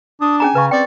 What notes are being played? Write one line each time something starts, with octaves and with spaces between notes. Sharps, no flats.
D4 D#6
C#4 G#4 G#5 A#5
C#3 B4 C#6
C4 D5 G5 D6